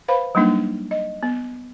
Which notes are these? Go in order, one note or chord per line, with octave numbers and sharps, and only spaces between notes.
B4 C5 F5 B5
F#3 G3 A#3 D4 D#4
D#5
B3